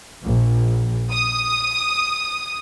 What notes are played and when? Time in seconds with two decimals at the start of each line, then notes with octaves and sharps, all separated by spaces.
0.24 A#1
1.10 D#6